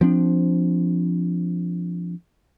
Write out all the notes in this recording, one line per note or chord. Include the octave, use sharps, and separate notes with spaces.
F3 C4 D4